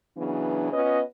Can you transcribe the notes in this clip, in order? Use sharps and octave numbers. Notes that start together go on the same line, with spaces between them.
C#3 E3 F#3 B3 D4
B3 C#4 F4 B4 D#5